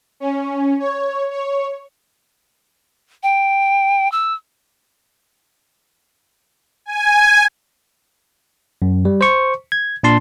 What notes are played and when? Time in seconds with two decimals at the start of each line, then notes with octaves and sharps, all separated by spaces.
0.20 C#4
0.79 C#5
1.31 C#5
3.23 G5
4.12 E6
6.86 G#5
8.82 F#2
9.05 G3
9.21 C5 C#6
9.72 G#6
10.03 A#2 D4 A5 C6